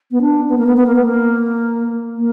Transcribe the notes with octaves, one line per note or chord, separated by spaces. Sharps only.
B3
D4
B3
A#3
B3
B3
A#3
B3
A#3
A#3